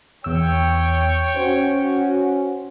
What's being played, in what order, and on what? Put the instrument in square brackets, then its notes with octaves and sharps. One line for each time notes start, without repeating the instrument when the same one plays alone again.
[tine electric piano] E2 E6 [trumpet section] C#5 G5
[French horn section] C#4 F#4 [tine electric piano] C5